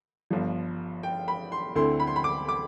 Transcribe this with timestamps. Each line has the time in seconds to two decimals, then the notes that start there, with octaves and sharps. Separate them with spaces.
0.30 G1 G2 F3
1.03 G5
1.28 B5
1.52 C6
1.75 D2 D3 A3 C4 E4 C6
2.00 B5
2.07 C6
2.16 B5
2.24 D6
2.49 D6